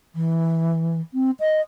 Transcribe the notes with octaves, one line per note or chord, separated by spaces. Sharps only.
E3
C4
D#5